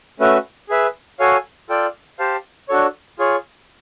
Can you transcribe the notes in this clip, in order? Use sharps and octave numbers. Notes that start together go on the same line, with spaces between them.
A3 C#4 F#4 B4 E5
G#4 B4 E5
F#4 A4 C#5 F5 G#5
F4 A4 D5 G5
G4 C5 F5 A5
D4 F#4 A4 C#5
F4 G#4 C#5